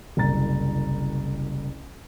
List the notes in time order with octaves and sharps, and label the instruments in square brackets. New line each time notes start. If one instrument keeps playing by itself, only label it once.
[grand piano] F#1 C2 A#5 A6